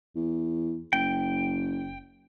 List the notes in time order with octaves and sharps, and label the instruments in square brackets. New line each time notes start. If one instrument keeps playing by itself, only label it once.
[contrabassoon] E2
[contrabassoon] F#1 [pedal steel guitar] G5